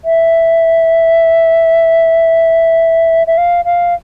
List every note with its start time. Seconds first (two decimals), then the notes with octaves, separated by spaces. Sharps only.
0.05 E5
3.27 E5
3.38 F5
3.65 F5